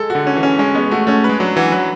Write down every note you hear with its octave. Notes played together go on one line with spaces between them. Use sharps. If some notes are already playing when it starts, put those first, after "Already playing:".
Already playing: G#3 A4
F#4
D3
C#4
E3
C#4
G#3 C#4
G#3 B3
A3 F#4
A3 C#4
B4
G#3
F#3 D4
E3 F#4
F#3 B4